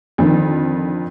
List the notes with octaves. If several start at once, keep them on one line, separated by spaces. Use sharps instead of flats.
F2 D3 D#3